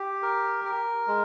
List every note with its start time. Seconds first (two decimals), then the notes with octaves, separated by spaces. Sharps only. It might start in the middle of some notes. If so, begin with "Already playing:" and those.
Already playing: G4
0.23 A#4
0.65 A#4
1.07 G#3